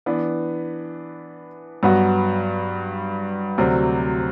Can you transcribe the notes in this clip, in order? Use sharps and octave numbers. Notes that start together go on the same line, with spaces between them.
E3 B3 D4
G2 F#3 B3 F#4
D2 C3 F#3 C4